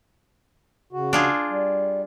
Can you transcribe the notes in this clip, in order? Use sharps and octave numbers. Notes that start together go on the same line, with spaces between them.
C#3 F#4
D4 F4 G#4
G3